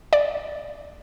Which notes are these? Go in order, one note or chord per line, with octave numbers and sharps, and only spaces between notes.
D5